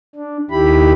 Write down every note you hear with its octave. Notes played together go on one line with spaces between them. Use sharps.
D4
D#2 D#3 E4 G4 B5